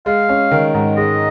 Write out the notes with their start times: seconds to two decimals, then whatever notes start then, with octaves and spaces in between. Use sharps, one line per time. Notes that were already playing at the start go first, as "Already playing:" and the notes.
0.06 G#3 F5
0.29 C#4
0.51 D#3
0.74 G#2
0.97 G#3 D#5